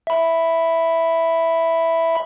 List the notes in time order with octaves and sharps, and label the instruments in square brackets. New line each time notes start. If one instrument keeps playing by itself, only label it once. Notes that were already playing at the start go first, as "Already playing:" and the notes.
[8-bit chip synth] E5 B5